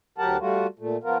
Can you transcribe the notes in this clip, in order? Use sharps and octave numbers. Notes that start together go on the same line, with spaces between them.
D2 F#3 G4 A#4 F#5 A5
G3 A3 F4 F#4
A#2 A3
F3 B3 F4 A#4